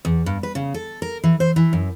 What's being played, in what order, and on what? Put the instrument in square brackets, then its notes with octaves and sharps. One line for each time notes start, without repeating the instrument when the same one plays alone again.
[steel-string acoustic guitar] E2
G2
B4
C#3
A4
A#4
E3
C5
E3
F#2